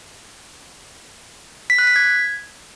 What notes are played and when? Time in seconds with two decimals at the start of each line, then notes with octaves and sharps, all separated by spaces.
1.70 B6
1.78 F#6
1.87 B6
1.96 G#6